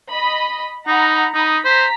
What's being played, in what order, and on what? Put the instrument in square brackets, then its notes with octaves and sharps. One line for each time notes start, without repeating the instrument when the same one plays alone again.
[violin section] D#5 B5
[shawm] D#4 [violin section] F#5 A#5 B5
[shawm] D#4 [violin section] B5 D#6
[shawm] C5 [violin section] A#5 B6